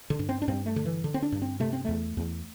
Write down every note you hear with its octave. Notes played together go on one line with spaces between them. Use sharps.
D3
G2
C4
D4
G2 C4
A3
D3
E3
D3
C4
D4
G2
C4
C3 A3
C4
E2 A3
E2